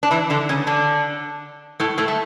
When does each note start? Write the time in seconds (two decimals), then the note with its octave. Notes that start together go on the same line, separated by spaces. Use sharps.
0.03 D4
0.11 E3 E4
0.30 D3 D4
0.49 C#3 C#4
0.67 D3 D4
1.80 A2 A3
1.98 A2 A3
2.08 A3